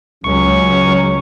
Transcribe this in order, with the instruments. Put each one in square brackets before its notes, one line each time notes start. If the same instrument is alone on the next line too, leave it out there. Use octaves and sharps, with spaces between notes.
[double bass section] C#2 [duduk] F#3 [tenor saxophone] C#4 [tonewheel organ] C#6